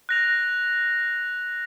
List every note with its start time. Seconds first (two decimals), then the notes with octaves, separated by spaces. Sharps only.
0.09 F#6 A#6 F7